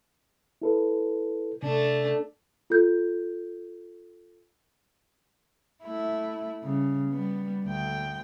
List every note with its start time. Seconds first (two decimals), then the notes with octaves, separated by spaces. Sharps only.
0.62 E4 A4 B4
1.63 C3 A3 D4
2.70 F4 A4 G6
5.83 A3 E4
6.61 C#3 G3
7.10 G3 B3
7.65 D2 G5